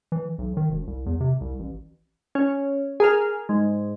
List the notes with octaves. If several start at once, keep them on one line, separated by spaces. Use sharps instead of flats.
E3
B1
D#3
E1
C2
E2
C3
C2
A1
C#4
G#4 A#4 F6
G#2